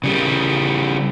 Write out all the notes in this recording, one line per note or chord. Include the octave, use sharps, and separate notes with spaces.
C#3 G3